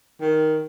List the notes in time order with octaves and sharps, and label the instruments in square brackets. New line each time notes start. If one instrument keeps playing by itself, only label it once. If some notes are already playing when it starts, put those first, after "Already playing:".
[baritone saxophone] D#3